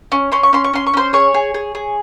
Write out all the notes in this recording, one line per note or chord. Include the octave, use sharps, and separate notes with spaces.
C#4
C#4 C6
C#6
C#4 C6
C#6
C#4 C6
C#6
C#4 C5 C6
G#4 C#5 C#6
G#4
G#4
G#4